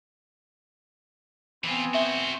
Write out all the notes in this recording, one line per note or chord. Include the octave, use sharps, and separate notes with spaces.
E3 B3 C4 F4 G#5
F#4 C5 E5